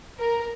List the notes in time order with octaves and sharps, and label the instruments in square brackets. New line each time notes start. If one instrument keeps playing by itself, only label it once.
[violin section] A#4